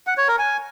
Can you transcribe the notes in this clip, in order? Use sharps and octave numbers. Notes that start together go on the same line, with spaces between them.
F#5
C#5
A#4
G#5